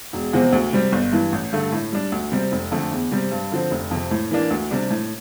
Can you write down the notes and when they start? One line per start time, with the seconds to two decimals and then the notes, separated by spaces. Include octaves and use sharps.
0.13 E1
0.33 E2 C3 F3 C4
0.53 D2
0.73 C3 G3 C4
0.92 G1
1.12 G2 E3
1.32 A1
1.52 G2 D3 A3
1.72 A2
1.92 G3 D4
2.12 D2
2.32 C3 G3 C4
2.52 F1
2.72 F2 D3 A3
2.92 E2
3.11 C3 G3 C4
3.32 G2
3.51 D3 F3 C4
3.71 F1
3.91 F2 C3
4.11 A2
4.31 E3 A#3 D4
4.51 D2
4.71 C3 G3 D4
4.90 A2